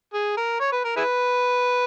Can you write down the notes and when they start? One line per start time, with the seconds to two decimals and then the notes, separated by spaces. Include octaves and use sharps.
0.14 G#4
0.37 A#4
0.61 C#5
0.72 B4
0.85 A#4
0.97 E4 G#4 B4